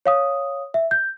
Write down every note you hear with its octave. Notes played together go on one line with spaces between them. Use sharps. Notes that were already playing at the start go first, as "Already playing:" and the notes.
C#5 F5 D#6
E5
G6